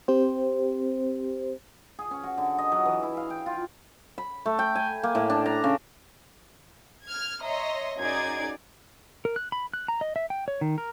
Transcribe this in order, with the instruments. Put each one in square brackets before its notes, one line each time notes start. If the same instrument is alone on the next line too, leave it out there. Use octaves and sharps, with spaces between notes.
[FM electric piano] C4 G4 C5
[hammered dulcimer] G#4
C#4
F#4
D3
D#5
F#3
E3
E4
F5
G5
F4
B5
A3
G5
G#5
A#3
A2
D4
A#5
C#3
[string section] F6 G#6
C#5 D#5 E5 A#5 C6
F#2 D#4 G#4 D5 G#6
[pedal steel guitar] A#4
F#6
B5
F#6
A#5
D#5
E5
G5
C#5
D#3
A#4